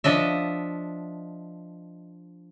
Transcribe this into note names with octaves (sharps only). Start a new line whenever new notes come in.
F3 D4 D#5 E5